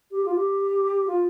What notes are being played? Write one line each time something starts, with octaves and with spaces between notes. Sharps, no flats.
G4
F4
G4
F4